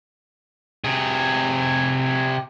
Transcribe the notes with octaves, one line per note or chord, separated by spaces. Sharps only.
C3 G#4